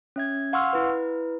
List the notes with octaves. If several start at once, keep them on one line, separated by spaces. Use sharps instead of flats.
C#4 E5 G#6
F5 F#5 C6 C#6 E6 F6
E4 B4